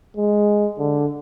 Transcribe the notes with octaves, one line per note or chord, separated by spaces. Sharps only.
G#3
D3